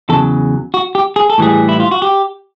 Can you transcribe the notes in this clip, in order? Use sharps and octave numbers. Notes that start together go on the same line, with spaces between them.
E2 C#3 F#3 A4
F#4
G4
G#4
A4
A2 E3 G3 G#4
E4
F4
F#4
G4